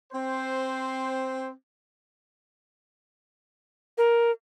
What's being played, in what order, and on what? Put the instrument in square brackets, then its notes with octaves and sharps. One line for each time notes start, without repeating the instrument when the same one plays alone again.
[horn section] C4 C5
[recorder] A#4